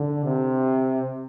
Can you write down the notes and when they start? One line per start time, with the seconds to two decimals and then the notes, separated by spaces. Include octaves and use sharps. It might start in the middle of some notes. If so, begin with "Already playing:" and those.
Already playing: D3
0.25 C3